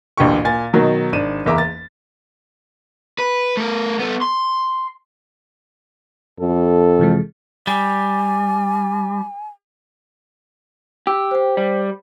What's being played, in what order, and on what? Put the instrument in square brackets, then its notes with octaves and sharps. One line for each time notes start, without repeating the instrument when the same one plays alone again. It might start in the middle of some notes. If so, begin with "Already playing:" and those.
[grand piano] A1 D2 A#2 G4 C#6
A#2 G#5 A6
B2 D#3 F#3 D#4
G#1 D4 D#7 E7
F#1 E2 A#3 E5 A#5 D6
A6
[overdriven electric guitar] B4
A3 A#4
B3 A4
C6
[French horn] F2 [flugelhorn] A4
[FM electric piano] C3 E3 G#3
[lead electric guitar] G3 [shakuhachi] G#5
[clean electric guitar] G4 [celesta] E6
[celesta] C5 G5
[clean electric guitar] G3